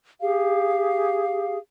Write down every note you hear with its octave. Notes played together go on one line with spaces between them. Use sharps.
G4 G#4 F5